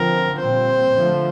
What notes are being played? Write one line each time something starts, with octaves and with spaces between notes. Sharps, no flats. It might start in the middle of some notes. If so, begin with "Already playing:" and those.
Already playing: D3 F3 C4 A#4
A#2 G3 C4 C5
D3 F3 A3